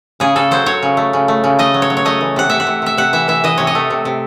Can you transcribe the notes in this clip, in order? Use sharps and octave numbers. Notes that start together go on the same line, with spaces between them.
C#3 G#4
C#3 A4
F#3 C5
F#3 C#5
C#3
A3
C#3
A3
C#3
A3 D#5
F#3
C#5
F#3
C#5
A3 D#5
E3
C3 F#5
C3 E5
F#5
C3
C3 E5
C3 F#5
E3 E5
E3 E5
E3 D#5
C3 C#5
D#5
A3
C3
C3